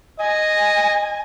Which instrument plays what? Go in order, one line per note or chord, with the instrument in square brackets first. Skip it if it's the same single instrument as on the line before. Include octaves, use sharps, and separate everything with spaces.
[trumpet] D#5 [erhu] G#5